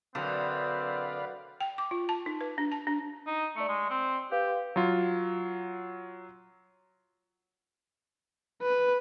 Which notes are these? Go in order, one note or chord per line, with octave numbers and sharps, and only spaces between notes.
F#2 B2 D3 C4 D4 B4 D5 F5
G5
D6
F4
A5
D#4
B4
D4
A5
D4
D#4
A3 D5 C#7
G#3
C4
G4 B4 F5 G6
F#3 F4
B4